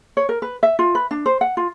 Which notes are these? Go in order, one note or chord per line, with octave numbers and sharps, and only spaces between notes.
C#5
A#4
B4
E5
F4
B4
D4
C5
F#5
F4